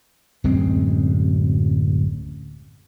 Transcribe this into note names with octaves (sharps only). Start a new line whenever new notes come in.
D1 F#2 G#3 C4